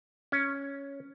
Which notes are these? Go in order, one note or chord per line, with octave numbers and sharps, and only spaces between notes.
C#4